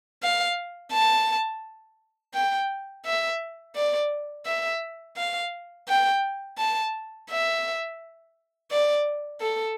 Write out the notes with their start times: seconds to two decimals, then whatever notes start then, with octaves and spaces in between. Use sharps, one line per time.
0.23 F5
0.93 A5
2.34 G5
3.06 E5
3.75 D5
4.46 E5
5.17 F5
5.88 G5
6.58 A5
7.30 E5
8.71 D5
9.41 A4